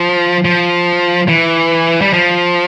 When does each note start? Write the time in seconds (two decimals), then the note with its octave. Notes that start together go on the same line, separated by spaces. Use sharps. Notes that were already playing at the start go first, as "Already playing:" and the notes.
Already playing: F3
0.45 F3
1.29 E3
2.01 G3
2.13 F3